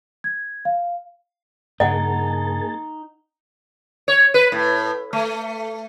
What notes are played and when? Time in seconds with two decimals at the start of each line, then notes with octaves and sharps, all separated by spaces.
0.24 G#6
0.65 F5
1.80 G2 C#3 A#3 D#4 G#4 D#5 F#5 A5
4.08 C#5
4.34 B4
4.52 A2
5.13 A3